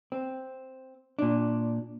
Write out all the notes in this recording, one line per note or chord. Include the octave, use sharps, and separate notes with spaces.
C4
A#2 D4